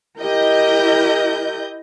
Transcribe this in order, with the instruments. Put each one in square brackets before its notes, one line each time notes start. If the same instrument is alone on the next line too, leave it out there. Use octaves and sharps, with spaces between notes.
[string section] E4 D#5 G6 [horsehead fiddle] G4 A#4